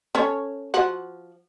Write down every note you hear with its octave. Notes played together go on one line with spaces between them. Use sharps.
C#4 A4 C#5
F3 F#4 F#5